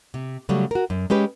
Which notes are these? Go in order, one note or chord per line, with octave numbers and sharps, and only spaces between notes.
C3
C#3 F#3 G3 A3 C#4
F#4 A#4
F#2
G#3 C#4 G4 B4